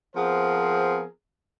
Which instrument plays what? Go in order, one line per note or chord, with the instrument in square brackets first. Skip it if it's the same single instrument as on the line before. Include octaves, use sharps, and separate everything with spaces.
[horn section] F3 B3 C4 G#4 A#4 C5